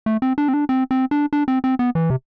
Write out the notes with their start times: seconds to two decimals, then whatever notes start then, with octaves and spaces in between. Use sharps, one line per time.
0.06 A3
0.22 C4
0.38 D4
0.48 C4
0.54 D4
0.69 C4
0.91 C4
1.11 D4
1.33 D4
1.48 C4
1.64 C4
1.79 B3
1.95 E3
2.10 C3